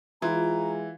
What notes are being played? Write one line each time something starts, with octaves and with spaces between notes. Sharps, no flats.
E3 G#3 F4 A#5